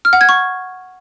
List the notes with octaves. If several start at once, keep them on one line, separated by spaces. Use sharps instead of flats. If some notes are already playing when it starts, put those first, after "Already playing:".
F6
F#5
G#6
C#6